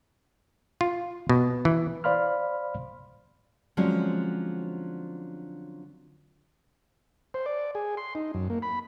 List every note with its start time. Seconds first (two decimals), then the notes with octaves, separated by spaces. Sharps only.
0.81 F4
1.29 B2
1.65 E3
2.04 C5 D5 F5 B5 C6 F6
3.77 D3 F3 F#3 G#3 C4 C#4
7.34 C5
7.46 D5
7.75 G#4
7.97 C6
8.15 D#4
8.34 F#2
8.50 A#3
8.62 B5